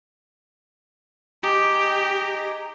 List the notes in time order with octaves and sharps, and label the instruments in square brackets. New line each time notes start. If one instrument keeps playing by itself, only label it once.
[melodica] D#4 G#4 D#5 [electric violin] G4